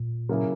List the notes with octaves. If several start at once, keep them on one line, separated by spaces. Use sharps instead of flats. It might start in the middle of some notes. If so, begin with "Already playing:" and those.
Already playing: A#2
C#3 F#3 A#3 E4 G#4